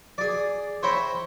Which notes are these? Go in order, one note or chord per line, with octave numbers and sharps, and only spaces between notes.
G#4 D5
C5 C#5 E5 G5 A#5 B5